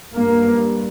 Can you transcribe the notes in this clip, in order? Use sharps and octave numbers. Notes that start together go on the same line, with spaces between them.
G2 A#3